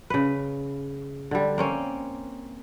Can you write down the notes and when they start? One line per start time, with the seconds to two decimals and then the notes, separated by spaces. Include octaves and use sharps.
0.10 C#3 B4
1.31 D3 G3
1.58 A#3 C4 C#4